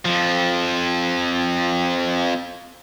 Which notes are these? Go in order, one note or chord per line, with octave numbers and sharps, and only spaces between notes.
F2 F3